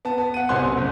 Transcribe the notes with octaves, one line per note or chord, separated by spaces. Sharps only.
B3 A5
B3
F#5 D#7
C2 B2 C5 G#5 C6 F#6
C#4
F#1